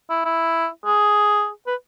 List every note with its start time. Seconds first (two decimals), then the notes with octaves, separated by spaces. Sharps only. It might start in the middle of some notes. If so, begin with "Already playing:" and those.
0.10 E4
0.25 E4
0.85 G#4
1.67 B4